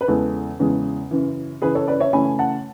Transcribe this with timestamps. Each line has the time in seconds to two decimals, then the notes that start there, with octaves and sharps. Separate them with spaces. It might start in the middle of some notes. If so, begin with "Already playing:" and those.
0.01 B4
0.08 E2 C#3 E3 G#3 A4
0.60 E2 C#3 E3 G#3
1.11 F#2 C#3 E3
1.62 F#2 C#3 E3 G#4 B4
1.75 A4 C#5
1.87 B4 D5
2.00 C#5 E5
2.13 F#2 C#3 E3 A3 G#5 B5
2.39 F#5 A5